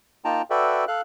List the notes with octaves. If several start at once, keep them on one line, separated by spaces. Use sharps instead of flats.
A#3 D#4 F4 G5 A5 A#5
F#4 A4 B4 D5 E5 G5
A4 F5 F#6